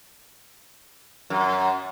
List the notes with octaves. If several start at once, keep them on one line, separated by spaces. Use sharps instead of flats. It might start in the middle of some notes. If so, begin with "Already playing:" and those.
F#2